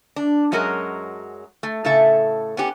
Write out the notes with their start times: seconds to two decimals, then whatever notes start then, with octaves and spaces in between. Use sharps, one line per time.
0.16 D4
0.52 F#2 F#3 G#3 C#4 A#4 D#5
1.63 A3
1.85 A2 C#3 A4 E5 A5
2.57 B3 C#4 G4